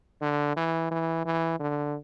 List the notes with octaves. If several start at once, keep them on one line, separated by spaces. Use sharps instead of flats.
D3
E3
E3
E3
D3